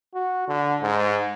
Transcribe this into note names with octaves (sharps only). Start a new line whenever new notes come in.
F#4
D3
G#2